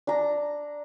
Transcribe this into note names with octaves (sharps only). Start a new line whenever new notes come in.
D4 A#5